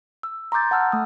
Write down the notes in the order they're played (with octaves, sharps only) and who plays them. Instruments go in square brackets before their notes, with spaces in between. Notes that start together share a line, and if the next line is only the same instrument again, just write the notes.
[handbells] E6
A#5 C6 D6 G6 A6
F#5 A5 E6 F6
A3 D#6